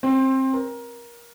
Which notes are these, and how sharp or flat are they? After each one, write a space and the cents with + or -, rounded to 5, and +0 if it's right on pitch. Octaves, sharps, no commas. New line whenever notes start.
C4 +20
A#4 +20